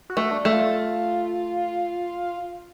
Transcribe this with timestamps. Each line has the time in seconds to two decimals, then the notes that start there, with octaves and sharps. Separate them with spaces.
0.10 F#4
0.17 A3
0.31 D4
0.45 A3
0.52 F4